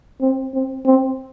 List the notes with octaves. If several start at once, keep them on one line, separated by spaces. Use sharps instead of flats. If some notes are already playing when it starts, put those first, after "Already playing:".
C4
C4
C4